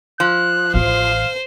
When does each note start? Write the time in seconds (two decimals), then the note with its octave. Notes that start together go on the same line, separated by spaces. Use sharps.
0.20 F3 F#6
0.74 A1 E3 C5 F5